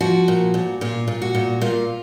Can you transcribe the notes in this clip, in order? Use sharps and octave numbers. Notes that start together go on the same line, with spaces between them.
F3 F#4
A#2
A#2
A#2 F4
A#2
F#4
A#2
A#2 F4